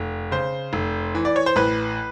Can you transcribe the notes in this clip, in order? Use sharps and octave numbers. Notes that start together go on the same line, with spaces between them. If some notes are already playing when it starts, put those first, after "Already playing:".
Already playing: F1
C#3 C5
F1
E3
D5
C#5
C5
A1 B4